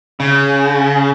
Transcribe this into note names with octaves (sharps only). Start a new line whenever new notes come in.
C#3